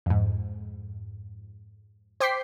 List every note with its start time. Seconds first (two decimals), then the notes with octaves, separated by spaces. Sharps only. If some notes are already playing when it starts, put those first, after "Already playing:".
0.06 F2 G#2
2.20 C5 G5 D6 G6 B6 C7